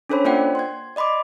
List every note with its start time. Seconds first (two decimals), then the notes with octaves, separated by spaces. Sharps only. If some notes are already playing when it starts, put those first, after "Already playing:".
0.09 C#4 D4 A4 C5 C#5 B5
0.25 A#3 F4 C5 D5 F#5 G5
0.55 C6 G#6
0.96 D5 D#5 B5 C6 D6